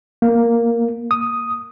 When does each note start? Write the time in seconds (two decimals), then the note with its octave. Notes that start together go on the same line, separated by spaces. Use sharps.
0.22 A#3
1.11 D#6